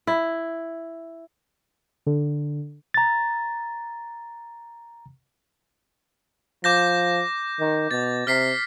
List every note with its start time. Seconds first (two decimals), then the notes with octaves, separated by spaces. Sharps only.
0.07 E4
2.06 D3
2.94 A#5 A6
6.64 F3 D6 G6 A#6
7.60 D#3
7.91 B2 A6
8.27 C3 F6 B6 C7